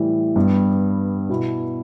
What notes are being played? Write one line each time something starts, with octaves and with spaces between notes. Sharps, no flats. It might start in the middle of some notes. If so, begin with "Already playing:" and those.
Already playing: A2 E3 G3 E4
G2 G3 B3
B2 B3 E4